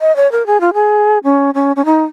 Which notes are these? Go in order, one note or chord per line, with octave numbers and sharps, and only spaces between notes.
D#5
C#5
A#4
G#4
F4
G#4
C#4
C#4
C#4
D#4